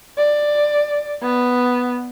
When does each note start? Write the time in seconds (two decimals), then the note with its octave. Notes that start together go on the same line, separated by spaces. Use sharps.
0.18 D5
1.22 B3